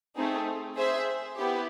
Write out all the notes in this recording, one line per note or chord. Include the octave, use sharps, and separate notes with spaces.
A3 C4 D#4 G#4
G#4 C5 E5
B3 E4 G4